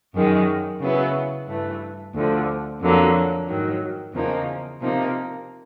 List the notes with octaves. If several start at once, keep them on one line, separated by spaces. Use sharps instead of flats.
F#2 D#3 G#3
C#3 F#3 B3 E4
G2 E3 A3
D2 D3 F3
F2 D3 F#3 A#3
G#2 D#3 F#3
E2 C#3 F3 A#3 D#4
C3 F3 A#3 D#4